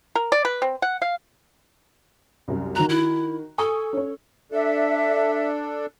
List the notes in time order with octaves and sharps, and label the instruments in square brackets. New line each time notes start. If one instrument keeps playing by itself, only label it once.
[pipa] A#4
D5
B4
C4
F#5
F5
[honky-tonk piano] C2 F#2
[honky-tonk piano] D#3 F#4 F#6 [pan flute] A#5
[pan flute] E4
[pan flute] A4 [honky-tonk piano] G#5 C#6 D#6
[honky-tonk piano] C#4 C#5
[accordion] D4 A4 [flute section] E5